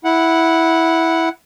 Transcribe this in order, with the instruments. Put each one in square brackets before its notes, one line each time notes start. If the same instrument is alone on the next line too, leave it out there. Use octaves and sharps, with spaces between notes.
[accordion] E4 F#5